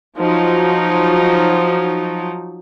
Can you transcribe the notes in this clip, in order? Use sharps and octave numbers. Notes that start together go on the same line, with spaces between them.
F3 F#3 D#4